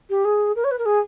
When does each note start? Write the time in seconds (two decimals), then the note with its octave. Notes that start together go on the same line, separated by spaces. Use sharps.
0.09 G4
0.24 G#4
0.55 A#4
0.64 C#5
0.71 B4
0.78 A#4
0.85 G#4